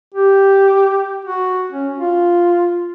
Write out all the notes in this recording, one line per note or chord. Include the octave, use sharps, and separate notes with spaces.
G4
F#4
C#4
F4